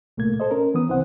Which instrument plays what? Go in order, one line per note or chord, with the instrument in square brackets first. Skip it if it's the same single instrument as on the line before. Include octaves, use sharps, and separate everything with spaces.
[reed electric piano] C2 A#2 A3 A#3 G#6
A4 C5 D#5
C#4 A#4
E3 B3 D#6
C2 E3 C4 C5 F#5